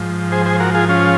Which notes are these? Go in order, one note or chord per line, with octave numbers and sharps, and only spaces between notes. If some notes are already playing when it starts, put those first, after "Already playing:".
Already playing: G#2 F3
G#4 C5
G#4 C5
F#4 A#4
F4 G#4
C#4 F4